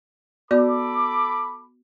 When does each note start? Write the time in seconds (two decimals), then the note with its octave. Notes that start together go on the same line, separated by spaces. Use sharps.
0.51 B3 F#4 A4 D5 B5 D6